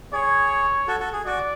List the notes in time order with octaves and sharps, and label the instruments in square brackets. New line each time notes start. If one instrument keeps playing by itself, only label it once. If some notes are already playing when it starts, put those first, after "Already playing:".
[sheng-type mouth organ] G#4 [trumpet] C#5
[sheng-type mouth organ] F#4 A4
F#4 A4
G#4
[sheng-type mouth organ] F#4 [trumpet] D5